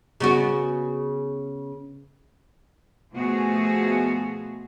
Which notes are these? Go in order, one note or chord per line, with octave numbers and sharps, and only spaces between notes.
C#3 B3 F#4
B2 F3 A3 B3 F#4 G#4